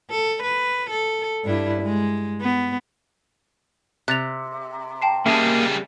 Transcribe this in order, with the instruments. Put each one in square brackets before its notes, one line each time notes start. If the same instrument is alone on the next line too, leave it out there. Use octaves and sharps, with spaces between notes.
[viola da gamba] A4
B4
A4
G2 D4 E4
G#3
B3
[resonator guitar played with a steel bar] C3 [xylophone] F#6 A6 F7
[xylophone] G5 A5 C7
[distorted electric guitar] C#3 G3 [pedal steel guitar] A#3 G#4 D#5 [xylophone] E5 A5